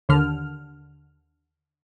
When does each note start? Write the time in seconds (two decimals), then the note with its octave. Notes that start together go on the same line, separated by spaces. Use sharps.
0.09 D#2 D3 F6